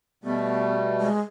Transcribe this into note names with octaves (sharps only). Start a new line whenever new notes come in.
B2 G3 A3 B3
G#3